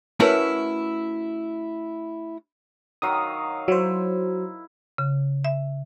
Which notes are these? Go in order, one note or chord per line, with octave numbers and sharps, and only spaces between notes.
A3 C#4 E4 F#4 A#4 B4
D#3 F#3 F5 D#6
F#3 E4 C5
C#3
E5